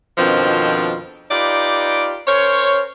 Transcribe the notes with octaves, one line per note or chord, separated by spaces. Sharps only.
F2 B2 D#3 F3 C4 D4
D#4 F4 G4 B4 D5
C#4 A#4 C5 C#5